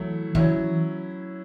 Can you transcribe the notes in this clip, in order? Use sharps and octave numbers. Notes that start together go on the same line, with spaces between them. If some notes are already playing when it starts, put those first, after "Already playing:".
Already playing: E3 F#3 A3 E4
E3 F#3 C#4 E4